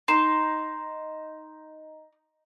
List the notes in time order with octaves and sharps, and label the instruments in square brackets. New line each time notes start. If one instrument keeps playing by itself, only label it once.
[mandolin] D#4 [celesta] C6 C7 E7